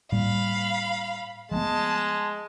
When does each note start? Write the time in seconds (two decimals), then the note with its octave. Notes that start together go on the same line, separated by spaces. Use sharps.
0.12 A2 G3 A#3 F5 B5
1.51 F3 G#3 A3 B3 A5